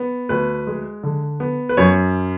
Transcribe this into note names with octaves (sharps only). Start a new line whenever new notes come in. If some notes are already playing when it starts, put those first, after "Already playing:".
Already playing: B3
D2 B4
G#3
D3
B3
B4
F#2 C#5